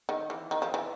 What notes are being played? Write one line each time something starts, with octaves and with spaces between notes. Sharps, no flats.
D#3
E3
D#3
F3
E3